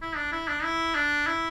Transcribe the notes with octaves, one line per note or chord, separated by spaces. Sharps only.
E4
D4
E4
D4
E4
D4
E4